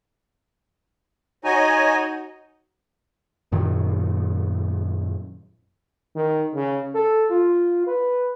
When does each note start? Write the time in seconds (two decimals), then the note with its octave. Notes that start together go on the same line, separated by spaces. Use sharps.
1.44 D#4 F#4 C#5 D#5 G#5
3.52 F#2 A#2 D#3 F#3
6.15 D#3
6.55 C#3
6.95 A4
7.30 F4
7.87 B4